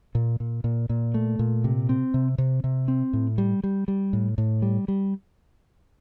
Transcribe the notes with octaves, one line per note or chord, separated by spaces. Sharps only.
A#2
A#2
A#2
A#2
A3
A#2
C3
C4
C3
C3
C3
C4
A2
G3
G3
G3
A2
A2
G3
G3